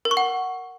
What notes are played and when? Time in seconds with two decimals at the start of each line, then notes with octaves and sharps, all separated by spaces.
0.05 A#4
0.11 C#6
0.17 F#5